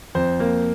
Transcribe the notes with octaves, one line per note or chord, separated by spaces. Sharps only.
F2 C5
A#3